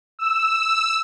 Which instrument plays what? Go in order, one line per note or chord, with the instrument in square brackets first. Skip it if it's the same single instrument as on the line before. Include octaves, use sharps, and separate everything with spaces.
[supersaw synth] E6